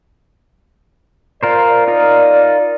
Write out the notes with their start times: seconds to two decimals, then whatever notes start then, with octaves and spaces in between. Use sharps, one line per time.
1.43 F4 A#4 C5 D5
1.88 D#4 F4 A#4